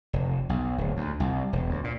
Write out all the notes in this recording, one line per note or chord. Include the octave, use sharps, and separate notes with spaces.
F1
B1
D1
D2
C2
E1
D2
A#2